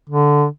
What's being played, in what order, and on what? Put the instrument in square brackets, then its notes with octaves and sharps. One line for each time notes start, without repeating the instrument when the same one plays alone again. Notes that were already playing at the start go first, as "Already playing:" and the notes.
[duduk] D3